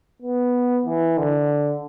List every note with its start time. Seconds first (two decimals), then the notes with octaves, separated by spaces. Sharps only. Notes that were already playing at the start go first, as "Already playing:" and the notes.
0.22 B3
0.86 E3
1.18 D3